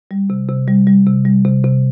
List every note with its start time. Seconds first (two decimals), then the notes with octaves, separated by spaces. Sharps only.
0.11 G3
0.30 C3
0.49 C3
0.68 G3
0.87 G3
1.07 C3
1.25 G3
1.45 C3
1.64 C3